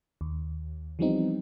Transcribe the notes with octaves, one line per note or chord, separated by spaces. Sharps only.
D#2
E3 F3 G3 B3 C4 D#4